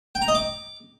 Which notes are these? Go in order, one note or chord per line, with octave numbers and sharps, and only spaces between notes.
G5
A#5
D#5
D6